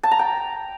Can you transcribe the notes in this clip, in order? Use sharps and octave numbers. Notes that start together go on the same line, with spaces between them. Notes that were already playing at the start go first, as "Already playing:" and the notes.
A5
A#5
G5